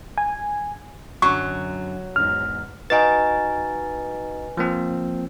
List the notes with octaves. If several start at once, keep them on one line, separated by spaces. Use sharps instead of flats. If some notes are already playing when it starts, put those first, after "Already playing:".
G#5
F#2 D3 F#3 C#6
E2 G#2 D#4 F6
D#4 F#4 B4 D#5 G#5 A6
F3 A#3 C4